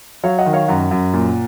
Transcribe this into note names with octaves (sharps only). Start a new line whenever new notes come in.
F#3 C#5 F5
D#5 F#5
D#3
C#5 F5
F#2 F#5 A#5
F#2
A#2